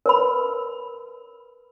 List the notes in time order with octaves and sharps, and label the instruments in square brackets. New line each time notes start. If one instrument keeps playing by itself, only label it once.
[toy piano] A#4 B4 B5